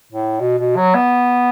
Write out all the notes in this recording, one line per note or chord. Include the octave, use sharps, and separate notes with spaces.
A2
B2
B2
F#3
B3